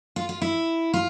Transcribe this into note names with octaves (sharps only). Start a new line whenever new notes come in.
F4
F4
E4
F4